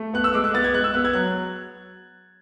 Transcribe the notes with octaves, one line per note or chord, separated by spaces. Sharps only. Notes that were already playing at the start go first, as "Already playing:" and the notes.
Already playing: A3
B3 F#6
E6
G#3 D6
F#6
B3 A6
G#6
G#3 F#6
E6
B3 F#6
G#6
F#3 F#6